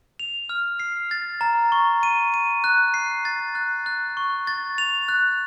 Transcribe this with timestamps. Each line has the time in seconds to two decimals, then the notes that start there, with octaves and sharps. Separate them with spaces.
0.20 F7
0.49 F6
0.80 C7
1.11 A6
1.41 A#5
1.72 C#6
2.03 D#7
2.34 D#7
2.64 F#6
2.94 C7
3.25 A6
3.55 F#6
3.86 F#6
4.17 C#6
4.47 A6
4.78 F7
5.08 F#6